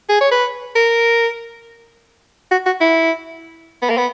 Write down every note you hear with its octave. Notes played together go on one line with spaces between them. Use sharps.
G#4
C#5
B4
A#4
F#4
F#4
E4
B3
A#3
B3